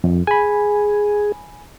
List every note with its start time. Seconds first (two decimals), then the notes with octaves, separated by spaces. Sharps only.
0.04 F2
0.27 G#4 G#5 B5